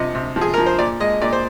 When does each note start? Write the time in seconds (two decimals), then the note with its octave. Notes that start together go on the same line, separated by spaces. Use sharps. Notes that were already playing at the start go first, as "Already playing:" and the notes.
Already playing: C3 F3 D#5
0.15 C3
0.36 F3
0.41 G#4
0.54 F3 A#4
0.66 C5
0.79 A#2 D5
1.00 G#3 D#5
1.22 A#2 D5
1.33 C5